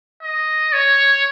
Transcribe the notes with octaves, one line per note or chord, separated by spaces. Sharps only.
D#5
C#5